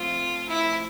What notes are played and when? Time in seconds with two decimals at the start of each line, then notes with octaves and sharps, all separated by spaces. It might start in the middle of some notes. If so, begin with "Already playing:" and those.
Already playing: F3 A3 C4 F4
0.49 E4